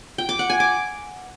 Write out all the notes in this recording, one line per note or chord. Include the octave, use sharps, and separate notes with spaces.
G5
D6
F#5
G#5
D6